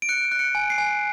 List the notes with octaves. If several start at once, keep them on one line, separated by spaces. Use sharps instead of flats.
D7
F#6 C#7
F#6
C#7
G#5
C7
G#5